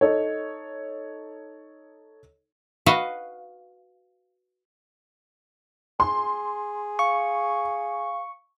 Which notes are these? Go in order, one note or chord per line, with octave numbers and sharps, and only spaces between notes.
D#4 A4 C#5
F#4 B4 D#5 F5
G#4 C6
F5 C#6